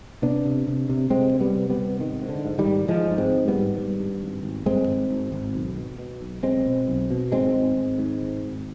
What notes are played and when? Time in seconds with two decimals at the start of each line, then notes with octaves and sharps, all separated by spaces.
0.22 C3 B3 D4
0.45 C3
0.67 C3
0.89 C3
1.10 C3 G#3 C4
1.33 D2
1.40 G3 B3
1.55 C3
1.70 G3 B3
1.78 C3
1.99 G#1 D#3
2.22 G#2
2.29 D3
2.45 G#2
2.58 D#3 G3
2.66 G#2
2.88 G#2 F3 G#3
3.11 G#2
3.18 G#3 C4
3.32 G#1
3.48 G3 B3
3.55 G#2
3.77 G#1 G3 B3
3.99 G2
4.22 G#1
4.43 G#1
4.66 G2 G#3 C4
4.88 G#1
5.11 G#1
5.32 G#1
5.55 B1
5.77 B2
5.99 B2
6.21 B1
6.43 B1 G#3 C4
6.66 B2
6.88 B1
7.11 B2
7.32 G#1 G#3 C4
7.54 G#1
7.77 G#1
7.98 G#2
8.21 G#1
8.44 G#1